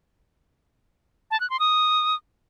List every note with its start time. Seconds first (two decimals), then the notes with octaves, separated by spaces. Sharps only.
1.31 A5
1.40 F#6
1.50 C6
1.60 D#6